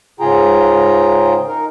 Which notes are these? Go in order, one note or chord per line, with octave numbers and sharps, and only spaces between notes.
G#2 C#3 F4 G#4 G5 A#5
D#4 A#4